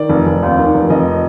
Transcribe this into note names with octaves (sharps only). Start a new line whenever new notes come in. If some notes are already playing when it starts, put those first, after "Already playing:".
Already playing: D#3 D5
F1
F1
D#2
D#3
F1
F1 D#5